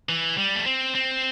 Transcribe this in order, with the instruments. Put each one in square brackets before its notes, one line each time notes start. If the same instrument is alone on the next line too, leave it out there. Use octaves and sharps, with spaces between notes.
[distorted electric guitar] E3
G3
A3
C4
C4